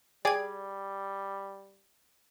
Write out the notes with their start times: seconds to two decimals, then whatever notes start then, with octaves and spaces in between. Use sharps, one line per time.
0.25 G3 G#4 D5 G5 G#6